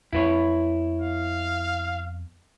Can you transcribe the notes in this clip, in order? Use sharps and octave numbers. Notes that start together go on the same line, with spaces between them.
F2 B3 E4 B4 C#5
F5